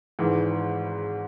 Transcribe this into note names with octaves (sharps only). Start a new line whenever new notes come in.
G#1 G#2 E3